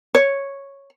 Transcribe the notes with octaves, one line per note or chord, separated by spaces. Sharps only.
C#5